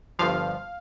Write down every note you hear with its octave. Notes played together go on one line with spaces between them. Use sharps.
G1 G2 F3 F5